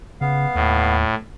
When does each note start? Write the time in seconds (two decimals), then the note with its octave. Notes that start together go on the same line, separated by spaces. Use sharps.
0.21 C#3 B3 F5
0.55 D#2 A2